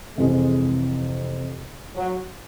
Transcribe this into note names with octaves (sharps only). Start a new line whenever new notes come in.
F2 C3 E3 G#3
F#3